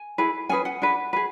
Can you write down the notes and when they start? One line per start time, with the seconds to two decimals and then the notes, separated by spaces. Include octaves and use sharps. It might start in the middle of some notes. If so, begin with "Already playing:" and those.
Already playing: G#5
0.18 E4 G#4 B4
0.49 C#4 G#4 B4 G#5
0.65 F#5
0.82 D4 G#4 B4
1.13 G#4 B4